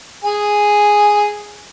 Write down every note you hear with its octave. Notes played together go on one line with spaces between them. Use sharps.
G#4 G#5